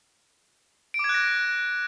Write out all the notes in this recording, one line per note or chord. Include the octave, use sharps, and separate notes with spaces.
D7
D6
G#6
F#6
A#6